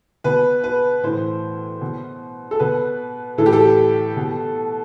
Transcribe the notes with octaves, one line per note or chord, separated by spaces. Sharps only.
B2 B4
B4
A2 E3 C5
B2
A4
B2 B4
A2 E3 A4
G4
A4
B2